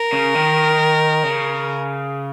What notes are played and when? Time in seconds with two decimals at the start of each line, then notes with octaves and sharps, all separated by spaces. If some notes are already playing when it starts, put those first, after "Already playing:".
Already playing: A#4
0.13 C#3
0.35 D#3
1.23 C#3